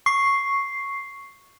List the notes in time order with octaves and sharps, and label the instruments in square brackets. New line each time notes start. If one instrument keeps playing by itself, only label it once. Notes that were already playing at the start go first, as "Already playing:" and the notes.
[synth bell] C#6 C7